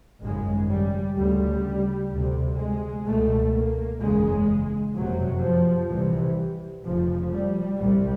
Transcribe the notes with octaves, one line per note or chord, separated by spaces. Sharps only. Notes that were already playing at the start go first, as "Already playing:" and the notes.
G#1 F#2 C#3 G#3
G3
D2 C#3 G3
D2 C3
G#3
C#2 B2 A3
A#3
F#1 E2 C#3 G#3
F#1 F2 C3 F#3
F3
C2 C3 E3
F1 F2 C#3 F3
G3
C2 C3 G3